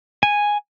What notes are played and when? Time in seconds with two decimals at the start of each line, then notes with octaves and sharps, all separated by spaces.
0.23 G#5